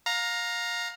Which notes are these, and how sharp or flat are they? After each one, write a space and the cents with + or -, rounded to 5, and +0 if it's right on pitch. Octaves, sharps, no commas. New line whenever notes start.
F5 +25 A#5 +0